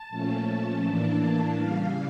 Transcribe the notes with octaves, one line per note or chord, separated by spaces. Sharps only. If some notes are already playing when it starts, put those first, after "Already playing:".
Already playing: A5
A#2 F3 A3 C#4
A2 E3 A#3 D4
C#3 E3 G3 F5